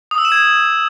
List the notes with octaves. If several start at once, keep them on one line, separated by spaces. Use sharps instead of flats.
D#6
E6
E7
G#6